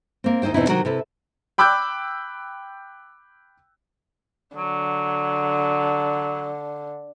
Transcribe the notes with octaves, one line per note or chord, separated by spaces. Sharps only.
A#3 C4
D#2 D#4 E4 C5 G5
E2 B2 C4 D#4 E4
C3 D#3 F#3 F#4 A#4
C3 E4 A4 B4
G5 B5 D6 E6 F#6 G6
D3 F#3